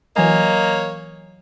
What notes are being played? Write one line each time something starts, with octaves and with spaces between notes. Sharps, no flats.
E3 F#3 A#3 C#5 D#5 G#5